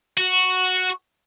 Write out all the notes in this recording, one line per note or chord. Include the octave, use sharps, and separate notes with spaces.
F#4